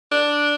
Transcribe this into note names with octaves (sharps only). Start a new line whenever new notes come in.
D4